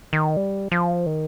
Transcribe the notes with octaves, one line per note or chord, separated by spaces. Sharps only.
D#3
G3
F3
D#3